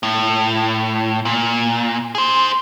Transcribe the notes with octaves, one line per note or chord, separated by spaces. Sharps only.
A2
A#2
G#4 C5